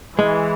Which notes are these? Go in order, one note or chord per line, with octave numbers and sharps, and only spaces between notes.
E3 G#3